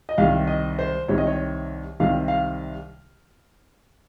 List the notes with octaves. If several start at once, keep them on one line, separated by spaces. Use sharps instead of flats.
D#5
C2 C3 D#3 F5
D#5
C5
C2 C3 D#3 C#5
D#5
C#5
C2 C3 D#3 F5
F5